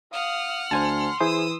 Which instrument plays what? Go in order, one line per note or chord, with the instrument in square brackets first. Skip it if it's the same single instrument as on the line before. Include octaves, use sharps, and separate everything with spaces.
[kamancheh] F5 D#6 [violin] F#5 F6
[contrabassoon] D2 [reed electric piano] C5 G#5 A5 [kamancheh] C6
[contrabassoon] E3 [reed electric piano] E4 G#4 C5 [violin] D#6 E6